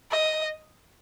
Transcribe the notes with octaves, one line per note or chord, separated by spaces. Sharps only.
D#5